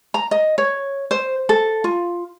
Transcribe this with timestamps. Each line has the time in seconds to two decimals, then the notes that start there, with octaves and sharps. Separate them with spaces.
0.14 A#5
0.31 D#5
0.58 C#5
1.11 C5
1.49 A4
1.84 F4